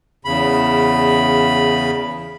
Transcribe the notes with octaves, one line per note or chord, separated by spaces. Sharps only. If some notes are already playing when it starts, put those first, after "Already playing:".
E2 C#3 B5